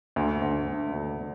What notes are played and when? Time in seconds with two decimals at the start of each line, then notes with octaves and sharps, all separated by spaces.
0.16 D2
0.42 D2
0.68 D3
0.93 D2
1.19 D3